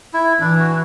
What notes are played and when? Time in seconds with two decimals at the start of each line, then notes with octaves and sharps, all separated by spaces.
0.14 E4
0.41 E3 D4
0.59 F#4